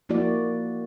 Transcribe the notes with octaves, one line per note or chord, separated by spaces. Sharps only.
F3 A#3 E4 F#4 D5